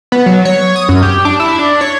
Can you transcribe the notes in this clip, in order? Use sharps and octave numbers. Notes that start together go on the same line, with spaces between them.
B3
F#3
C#5
D#6
F#2
G4
D4
E4
D4
C#5